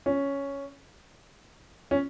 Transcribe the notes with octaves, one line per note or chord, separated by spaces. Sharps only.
C#4
C#4